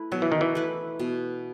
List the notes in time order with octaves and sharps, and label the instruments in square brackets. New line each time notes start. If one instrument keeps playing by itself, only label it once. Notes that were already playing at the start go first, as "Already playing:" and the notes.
Already playing: [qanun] A3 E4 B4
[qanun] B2 [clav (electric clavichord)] F#3
[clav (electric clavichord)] E3
D#3
E3
[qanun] A3 E4 B4
B2